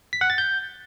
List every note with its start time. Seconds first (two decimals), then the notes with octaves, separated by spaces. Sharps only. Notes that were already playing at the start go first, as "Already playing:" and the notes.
0.13 B6
0.21 F#5
0.30 A6
0.38 G6